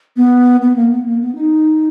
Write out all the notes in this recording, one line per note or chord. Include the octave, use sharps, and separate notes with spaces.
B3
B3
A#3
B3
A#3
B3
D#4